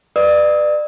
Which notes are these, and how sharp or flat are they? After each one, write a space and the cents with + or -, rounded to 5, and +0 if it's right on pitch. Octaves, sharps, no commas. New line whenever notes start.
B4 +0 D5 +30 D#6 +45